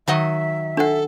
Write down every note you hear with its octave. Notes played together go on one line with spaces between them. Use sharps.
D#3 F#3 D#5 E5
D4 A4 F#5